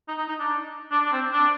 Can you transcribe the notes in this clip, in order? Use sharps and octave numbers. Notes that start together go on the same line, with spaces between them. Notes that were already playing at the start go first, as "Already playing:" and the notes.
D#4
D#4
D#4
D4
D4
D4
C4
D4